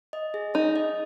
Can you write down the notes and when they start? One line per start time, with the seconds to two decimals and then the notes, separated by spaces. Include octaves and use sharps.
0.13 D#5
0.34 G#4
0.54 D#4 G#4
0.76 D#5